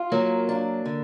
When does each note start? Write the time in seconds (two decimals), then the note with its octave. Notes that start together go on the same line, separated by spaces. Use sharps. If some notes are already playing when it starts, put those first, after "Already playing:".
Already playing: F4
0.12 F#3 A#3
0.49 D4
0.85 D3